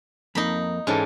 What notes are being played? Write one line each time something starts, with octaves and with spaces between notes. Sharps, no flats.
F2 A#3 D#4 B5
G#2 E3 C#4 A4